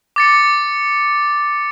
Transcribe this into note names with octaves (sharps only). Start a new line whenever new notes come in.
D6 A6 C#7